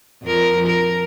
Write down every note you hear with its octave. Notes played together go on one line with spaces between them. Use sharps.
F2 F3 A#4
A#4